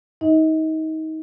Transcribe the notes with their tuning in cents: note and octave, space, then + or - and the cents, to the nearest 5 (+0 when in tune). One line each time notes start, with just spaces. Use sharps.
D#4 +25 D#5 +35